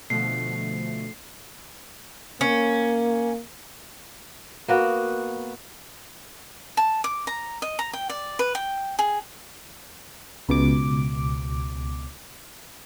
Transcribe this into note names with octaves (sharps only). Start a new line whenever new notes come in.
B2 D3 F3 A3 C7
A#3 C#4
A#3 B3 F#4
A5
D6
A#5
D#5
A#5
G5
D5
B4
G5
G#4
C#2 B2 D6